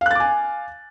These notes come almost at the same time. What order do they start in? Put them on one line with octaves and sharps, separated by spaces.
F5 F#6 A6 D6 G#5